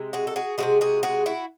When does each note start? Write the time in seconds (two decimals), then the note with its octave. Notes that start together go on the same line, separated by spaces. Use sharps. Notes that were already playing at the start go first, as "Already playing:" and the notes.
Already playing: C3 G#3
0.13 F#4 G#4
0.27 A4
0.36 F#4 G#4
0.58 C3 F3 G#3 F#4 G#4
0.81 F#4 G#4
1.03 F#4 G#4
1.26 E4 F#4